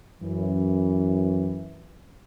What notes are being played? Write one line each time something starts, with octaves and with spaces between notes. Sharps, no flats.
F#2 E3